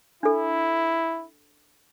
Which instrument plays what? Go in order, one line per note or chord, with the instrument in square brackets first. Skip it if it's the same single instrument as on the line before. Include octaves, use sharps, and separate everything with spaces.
[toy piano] D4 A4 [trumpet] E4